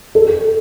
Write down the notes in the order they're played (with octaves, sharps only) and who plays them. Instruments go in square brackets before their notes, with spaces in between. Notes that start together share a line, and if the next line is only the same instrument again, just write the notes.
[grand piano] A4